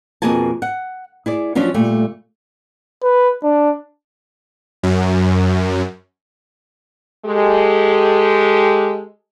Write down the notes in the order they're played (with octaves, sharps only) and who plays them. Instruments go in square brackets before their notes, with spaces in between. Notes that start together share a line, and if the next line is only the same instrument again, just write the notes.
[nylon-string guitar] F2 B2 A#3 G#4 G#5 A5
F#5
E4 G#4 D5
F3 F#3 C#4 D4 F4
A#2 G3 A3
[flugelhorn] B4
D4
[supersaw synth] F#2
[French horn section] G#3 G4 A4